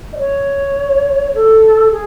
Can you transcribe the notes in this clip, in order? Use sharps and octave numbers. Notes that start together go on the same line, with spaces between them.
D#5
C#5
A4
G#4